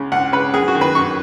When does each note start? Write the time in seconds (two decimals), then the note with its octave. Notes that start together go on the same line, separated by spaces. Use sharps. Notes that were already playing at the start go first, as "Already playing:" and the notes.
Already playing: C#2 C#3
0.12 C#2 F#5
0.32 C#3 B4
0.54 F#2 G#4
0.68 F#4
0.75 D#3
0.81 B4
0.95 F#2 C#6